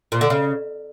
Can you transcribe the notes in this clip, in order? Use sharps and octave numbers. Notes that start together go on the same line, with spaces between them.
A#2
D3
C#3